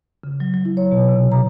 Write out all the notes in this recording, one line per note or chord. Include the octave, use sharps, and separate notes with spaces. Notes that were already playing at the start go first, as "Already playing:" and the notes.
C#3
F#3
F#3
E4
C#5
B2
C3
A#5